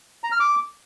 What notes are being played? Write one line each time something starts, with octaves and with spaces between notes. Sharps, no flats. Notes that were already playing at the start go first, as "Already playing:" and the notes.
A#5
F6
D6